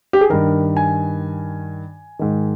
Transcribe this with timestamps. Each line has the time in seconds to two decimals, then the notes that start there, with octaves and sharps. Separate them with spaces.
0.13 G4
0.21 G#4
0.30 G2 D#3 A#4
0.77 G#5
2.19 G#2 D#3